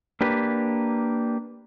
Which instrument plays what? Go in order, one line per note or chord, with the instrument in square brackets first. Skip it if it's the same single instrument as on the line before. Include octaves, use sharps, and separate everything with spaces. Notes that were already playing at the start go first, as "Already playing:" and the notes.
[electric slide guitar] A#3 D4 G4 B4